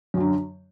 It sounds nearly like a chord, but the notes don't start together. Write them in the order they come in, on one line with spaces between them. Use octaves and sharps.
F#2 F#3 D3